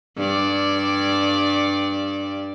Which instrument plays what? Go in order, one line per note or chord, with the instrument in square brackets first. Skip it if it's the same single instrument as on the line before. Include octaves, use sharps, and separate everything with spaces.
[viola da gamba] G2 D5